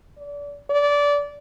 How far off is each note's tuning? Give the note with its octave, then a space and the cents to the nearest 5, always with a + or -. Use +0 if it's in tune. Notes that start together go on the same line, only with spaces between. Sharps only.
D5 -30
D5 -20